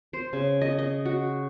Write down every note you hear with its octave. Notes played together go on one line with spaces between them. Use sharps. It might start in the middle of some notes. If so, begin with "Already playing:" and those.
C5
C#3
D#5
D#5
F#4